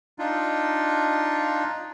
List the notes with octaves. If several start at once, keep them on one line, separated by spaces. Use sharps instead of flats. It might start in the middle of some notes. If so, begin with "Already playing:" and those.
D4 D#4 F4